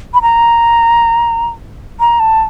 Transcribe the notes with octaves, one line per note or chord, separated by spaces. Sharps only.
B5
A#5
A#5
A5